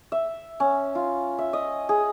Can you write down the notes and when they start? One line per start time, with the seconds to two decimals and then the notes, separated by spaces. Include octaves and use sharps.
0.12 E5
0.60 C#4
0.95 F4
1.39 E5
1.53 D#5
1.89 G#4